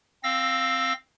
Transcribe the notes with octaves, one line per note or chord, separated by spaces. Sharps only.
C4 F5 E6 A#6